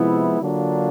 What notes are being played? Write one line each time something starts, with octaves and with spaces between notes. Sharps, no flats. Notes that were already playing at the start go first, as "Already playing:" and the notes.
Already playing: C3 F3 G#3 B3 E4
D3 F#3 A#3 D4 F4